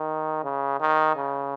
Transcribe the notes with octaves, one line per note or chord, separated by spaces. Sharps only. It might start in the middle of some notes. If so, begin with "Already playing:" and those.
Already playing: D#3
C#3
D#3
C#3